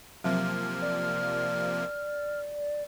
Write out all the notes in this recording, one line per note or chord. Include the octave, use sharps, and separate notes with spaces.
C3 F3 F#3 A#3 C4 F6
D5